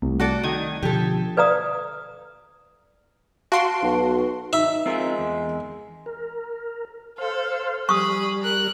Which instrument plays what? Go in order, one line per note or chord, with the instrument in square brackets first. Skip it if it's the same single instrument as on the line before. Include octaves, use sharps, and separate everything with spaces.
[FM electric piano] C2 [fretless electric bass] A3
[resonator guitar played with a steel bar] F#4 A4 D5
[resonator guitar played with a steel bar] D#3 [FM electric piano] D#6 G#6
[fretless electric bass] B2 D3 F3 [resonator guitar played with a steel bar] G4 A4
[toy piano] A4 B4 D5 F5 A#5 D#6
[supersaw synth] F#4 C6 [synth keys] F5 A5 D7
[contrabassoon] B1 [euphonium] B4
[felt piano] D#4 [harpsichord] E5
[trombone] G#3 [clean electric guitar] C4 F4 A#4
[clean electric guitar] E2
[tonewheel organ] A#4
[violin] A4 [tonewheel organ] C5 F5
[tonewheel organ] G3 [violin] G#4 B5 [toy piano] C#6 D#6
[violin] A#4 F#6